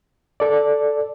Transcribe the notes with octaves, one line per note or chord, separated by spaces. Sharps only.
A4 D5